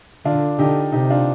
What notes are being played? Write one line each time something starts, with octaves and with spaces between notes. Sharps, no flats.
D3 D4 F4
D3 D#4 G4
C3 D#4 G4
D4 F4